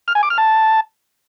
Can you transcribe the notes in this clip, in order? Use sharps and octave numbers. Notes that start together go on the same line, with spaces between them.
F6
G#5
D6
F6
A5